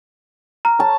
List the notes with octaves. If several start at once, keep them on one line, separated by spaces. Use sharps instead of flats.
A#5 F6
C#5 A5